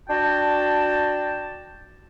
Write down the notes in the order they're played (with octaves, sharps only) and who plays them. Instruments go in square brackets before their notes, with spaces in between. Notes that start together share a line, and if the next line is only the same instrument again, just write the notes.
[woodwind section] D4 F#4 G5 A5